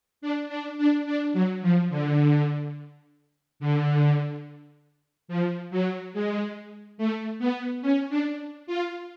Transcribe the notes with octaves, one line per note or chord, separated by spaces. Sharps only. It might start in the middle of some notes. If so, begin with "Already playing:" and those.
D4
D4
D4
D4
F#3
F3
D3
D3
F3
F#3
G#3
A3
B3
C#4
D4
F4